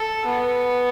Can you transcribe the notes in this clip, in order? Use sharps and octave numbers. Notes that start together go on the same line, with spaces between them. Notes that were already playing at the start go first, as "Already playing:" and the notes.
Already playing: A4
B3